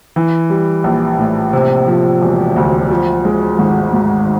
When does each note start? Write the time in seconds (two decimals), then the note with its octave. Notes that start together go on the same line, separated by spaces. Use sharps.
0.16 E3
0.50 G3
0.84 A#1
1.18 A2
1.53 C3
1.87 F3
2.22 E1
2.56 D2
2.90 F3
3.25 G#3
3.59 G#1
3.93 G#2